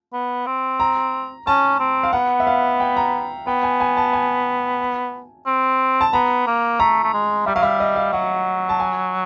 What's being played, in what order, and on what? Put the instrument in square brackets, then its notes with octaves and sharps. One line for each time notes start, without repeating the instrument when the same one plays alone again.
[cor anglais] B3
C4
[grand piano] A#5
[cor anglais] C#4 [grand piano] A5
[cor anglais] C4
[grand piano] F5
[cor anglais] B3 [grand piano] F#5
[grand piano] E5
F5
G5
A#5
[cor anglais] B3 [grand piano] G5
[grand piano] G#5
G#5
A5
G#5
[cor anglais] C4
[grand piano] A5
[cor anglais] B3 [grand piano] A#5
[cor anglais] A#3
[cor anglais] A3 [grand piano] A#5
[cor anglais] A3
G#3
[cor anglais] G3 [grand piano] E5
[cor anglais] F#3 [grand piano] F5
[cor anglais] G3 [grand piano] E5
[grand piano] D#5
F5
[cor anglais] F#3 [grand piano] F#5
[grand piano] A5
G#5